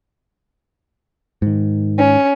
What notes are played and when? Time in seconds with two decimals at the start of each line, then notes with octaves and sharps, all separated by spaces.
1.42 G#2 D#3
1.98 C#4